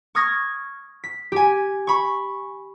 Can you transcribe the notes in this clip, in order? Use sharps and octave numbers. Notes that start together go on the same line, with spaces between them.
C#6 D#6 F6 G#6 A#6
B6
G4 G#5
B5 C#6